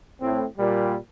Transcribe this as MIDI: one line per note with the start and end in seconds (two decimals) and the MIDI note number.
0.21 0.45 45
0.21 0.45 60
0.58 0.96 46
0.58 0.96 55